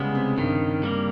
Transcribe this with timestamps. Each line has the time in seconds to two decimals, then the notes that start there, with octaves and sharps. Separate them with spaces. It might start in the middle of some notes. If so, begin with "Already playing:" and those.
Already playing: C#3 G3 G#3 B3
0.15 C3
0.37 G2 D#3
0.83 G3 A#3